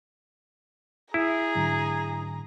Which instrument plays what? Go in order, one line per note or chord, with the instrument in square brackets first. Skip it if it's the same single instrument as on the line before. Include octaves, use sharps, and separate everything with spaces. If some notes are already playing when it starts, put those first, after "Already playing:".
[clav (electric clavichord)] E4 [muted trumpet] G#4 [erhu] A#5
[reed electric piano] G#2 D3 F#3